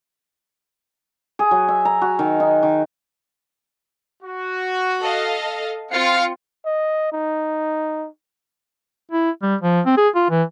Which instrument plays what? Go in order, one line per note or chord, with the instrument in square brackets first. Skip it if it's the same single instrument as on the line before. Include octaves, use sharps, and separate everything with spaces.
[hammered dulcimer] G#4
F#3
E5
A#5
F#4
D#3
D#4
D#3
[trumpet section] F#4
[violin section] A4 D#5 F5
[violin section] C4 F4 C#7 [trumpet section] F5
[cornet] D#5
D#4
[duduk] E4
G3
F3
C4
G#4
F4
E3